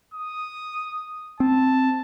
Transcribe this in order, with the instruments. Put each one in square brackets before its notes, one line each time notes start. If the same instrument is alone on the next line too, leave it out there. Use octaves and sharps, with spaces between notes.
[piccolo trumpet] D#6
[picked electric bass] C4 [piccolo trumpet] A5